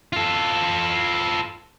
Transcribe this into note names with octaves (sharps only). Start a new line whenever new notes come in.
F4 A4